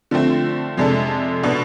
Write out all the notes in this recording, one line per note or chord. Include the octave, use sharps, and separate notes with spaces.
D3 F3 A3 C4
F2 C3 G#3 D4 A4
B2 B3 D4 A4